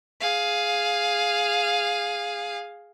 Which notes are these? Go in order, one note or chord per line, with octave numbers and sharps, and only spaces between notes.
G#4 F5